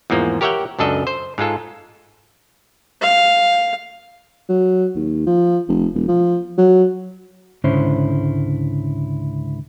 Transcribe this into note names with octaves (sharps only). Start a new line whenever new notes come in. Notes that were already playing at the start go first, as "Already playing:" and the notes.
E2 G#2 F3 A#3
G4 A#4 C#5 E5 F#5 G5
C#2 F#2 D4 A4 D#5
C5
G#2 G#3 F4 A4
F5
F#3
D#2
F3
F1
E1
F3
F#3
C#2 G#2 D3 C#4 E4 C5